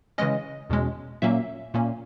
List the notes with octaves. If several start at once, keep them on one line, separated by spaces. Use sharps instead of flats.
C#3 E3 G#3 C#4 D#5
E2 B2 G#3 C#4
A#2 F#3 A#3 C#4 E5
A#2 A#3 C#4